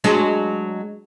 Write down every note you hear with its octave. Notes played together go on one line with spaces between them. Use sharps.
F#3 G#3 D4